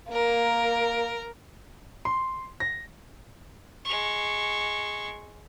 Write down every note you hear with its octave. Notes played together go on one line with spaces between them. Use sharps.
A#3 A#4
C6
A#6
G#3 C#6